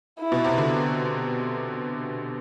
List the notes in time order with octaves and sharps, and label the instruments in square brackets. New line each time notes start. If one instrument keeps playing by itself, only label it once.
[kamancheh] E4
[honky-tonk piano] B2
C3
D3